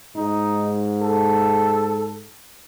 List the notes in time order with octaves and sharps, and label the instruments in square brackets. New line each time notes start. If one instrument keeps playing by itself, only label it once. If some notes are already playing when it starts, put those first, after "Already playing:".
[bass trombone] G#2 [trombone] D#4
[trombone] A4